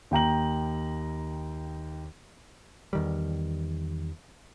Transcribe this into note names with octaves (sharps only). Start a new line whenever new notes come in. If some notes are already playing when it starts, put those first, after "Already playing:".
D#2 G5 A#5 F#7
E2 D#3 G3